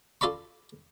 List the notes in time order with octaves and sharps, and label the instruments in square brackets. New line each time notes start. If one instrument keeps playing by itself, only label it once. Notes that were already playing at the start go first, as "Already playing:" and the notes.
[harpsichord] F4 A4 D5 B5 C#6